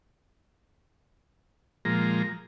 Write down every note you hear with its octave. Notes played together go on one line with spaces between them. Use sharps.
A#2 F3 G#3 A#5